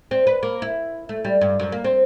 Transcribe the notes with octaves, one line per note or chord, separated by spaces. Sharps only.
C4
B4
A#3
E4
A3
G3
G2
F#2
A#3
C4